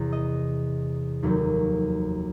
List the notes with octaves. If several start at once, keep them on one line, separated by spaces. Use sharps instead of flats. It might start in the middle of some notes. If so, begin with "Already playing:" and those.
Already playing: E2 C3 E3 A#5
D#5
F1 D#2 D#3 F#3